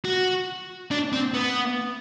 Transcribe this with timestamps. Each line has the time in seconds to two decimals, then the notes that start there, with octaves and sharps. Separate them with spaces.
0.05 F#4
0.91 D4
1.12 C4
1.34 B3